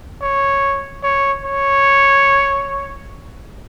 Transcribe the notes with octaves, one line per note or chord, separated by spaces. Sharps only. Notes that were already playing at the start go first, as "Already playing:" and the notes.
C#5
C#5
C#5